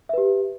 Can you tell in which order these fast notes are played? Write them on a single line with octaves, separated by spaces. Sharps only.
E5 B4 G4